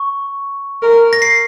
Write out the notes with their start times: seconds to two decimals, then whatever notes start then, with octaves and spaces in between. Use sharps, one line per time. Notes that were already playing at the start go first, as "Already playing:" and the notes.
Already playing: C#6
0.82 A#4
1.13 A#6
1.22 C7